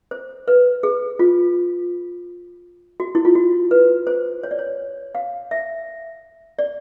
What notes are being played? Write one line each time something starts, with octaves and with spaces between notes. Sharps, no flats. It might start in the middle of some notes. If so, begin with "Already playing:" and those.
C5
B4
G#4
F4
F#4
E4
F4
F#4
B4
C5
C#5
D5
C#5
F5
E5
D5